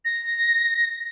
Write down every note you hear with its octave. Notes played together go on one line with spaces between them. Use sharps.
A#6